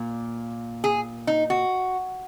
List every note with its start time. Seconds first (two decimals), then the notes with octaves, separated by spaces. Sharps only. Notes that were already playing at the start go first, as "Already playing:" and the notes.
Already playing: A#2 A#3
0.84 G#4
1.27 D#4
1.50 F#4